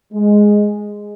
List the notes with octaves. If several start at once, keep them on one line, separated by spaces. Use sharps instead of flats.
G#3